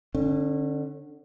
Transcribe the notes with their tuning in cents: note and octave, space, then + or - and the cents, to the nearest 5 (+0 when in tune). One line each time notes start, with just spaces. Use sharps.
D3 +20 C#4 -25